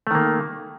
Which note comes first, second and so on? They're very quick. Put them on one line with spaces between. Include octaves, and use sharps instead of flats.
A3 D#3 A#3